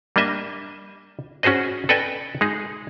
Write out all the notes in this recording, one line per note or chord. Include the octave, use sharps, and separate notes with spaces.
G3 A#3 D4 D#5 E5
C#4 F#4 G#4 C5 D#5
A4 B4 D5 D#5 G5 G#5
G#3 D#4 G#4